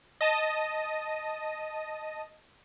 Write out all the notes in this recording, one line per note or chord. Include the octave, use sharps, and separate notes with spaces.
D#5 A5 A#6 D#7